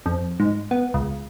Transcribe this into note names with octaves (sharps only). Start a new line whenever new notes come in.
F2
G#2
B3
C#2